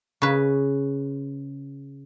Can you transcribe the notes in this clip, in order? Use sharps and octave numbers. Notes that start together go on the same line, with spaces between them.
C#3 B4